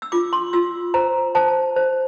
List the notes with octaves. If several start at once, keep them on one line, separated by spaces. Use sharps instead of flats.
E6
F4 D6
C6
F4 E6
C5 A#5
C5 A5
C5